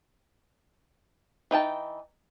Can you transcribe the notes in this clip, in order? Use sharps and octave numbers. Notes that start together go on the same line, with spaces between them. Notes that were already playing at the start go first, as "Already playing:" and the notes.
E3 D#4 G5 A5